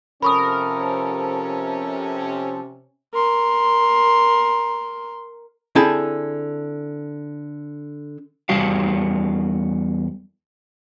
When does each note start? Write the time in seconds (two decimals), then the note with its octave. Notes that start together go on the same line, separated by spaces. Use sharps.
0.22 C3 F3 C#4 A4 A#4 B5 C#6 D#6
3.13 A#4 C6
5.75 D3 C4 E4 G#4 A4 A5
8.49 E2 G3 F#4 F5